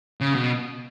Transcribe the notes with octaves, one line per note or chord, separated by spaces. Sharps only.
C#3
B2